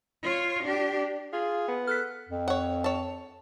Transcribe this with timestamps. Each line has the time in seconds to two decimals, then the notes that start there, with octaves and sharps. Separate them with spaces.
0.23 F4 C#5
0.63 D4 G4
1.33 F4 G#4
1.69 B3
1.87 A4 F6 F#6 B6
2.29 F2
2.48 C#5 F#5
2.84 C#5 A5